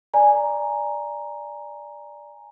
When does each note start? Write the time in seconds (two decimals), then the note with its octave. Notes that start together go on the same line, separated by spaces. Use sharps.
0.14 D5 G#5 A#5